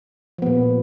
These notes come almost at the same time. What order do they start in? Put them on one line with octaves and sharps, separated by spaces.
F3 B3 A#2